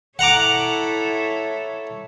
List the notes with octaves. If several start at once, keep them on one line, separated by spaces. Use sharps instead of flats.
E4 A4 C#5 F#5 A#5 D6